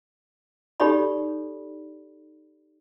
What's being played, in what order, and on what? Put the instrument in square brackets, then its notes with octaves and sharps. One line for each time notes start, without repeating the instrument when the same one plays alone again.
[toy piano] D#4 G4 A4 C#5 D5 B5